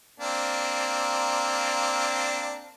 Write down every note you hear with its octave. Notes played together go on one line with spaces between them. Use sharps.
A#3 C4 D4